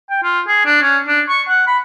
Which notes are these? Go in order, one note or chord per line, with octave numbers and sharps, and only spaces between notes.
G5
F4
G#4
D4
C#4
D4
C#6
F#5
B5